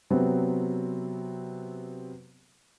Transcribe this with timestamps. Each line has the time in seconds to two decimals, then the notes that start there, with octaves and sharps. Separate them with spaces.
0.10 C3 F#3 B3 C4